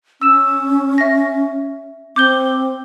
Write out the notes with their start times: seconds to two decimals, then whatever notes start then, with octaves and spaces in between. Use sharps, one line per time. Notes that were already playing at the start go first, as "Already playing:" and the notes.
0.21 C#4 E6 E7
0.98 E5 A#6
2.16 C4 D6 G6 G7